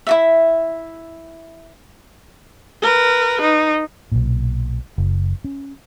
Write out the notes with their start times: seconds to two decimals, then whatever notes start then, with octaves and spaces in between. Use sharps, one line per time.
0.07 E4 F#4 E5
2.82 A#4 B4
3.41 D#4
4.12 B1 A#2
4.98 F#1
5.44 C#4